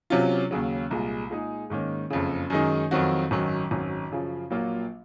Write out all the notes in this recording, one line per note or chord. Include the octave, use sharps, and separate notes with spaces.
C3 F#3 C#4 F4
D#2 C#3 F#3
C2 A#2 G#3
A#2 G#3 D#4 G#4
G#2 D#3 A#3 C#4
F#1 F2 C#3
F#2 D#3 G#3 D#4
F2 D#3 F#3 C4 F#4
G#1 F#2 D#3 F#3
G#1 F#2 D#3 F#3
F#2 C#3 F3
A#1 A#2 F#3 A#3 F4